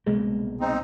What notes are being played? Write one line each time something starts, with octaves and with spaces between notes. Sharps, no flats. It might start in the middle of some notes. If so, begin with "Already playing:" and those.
C2 B2 G#3 A#3
C4 D#4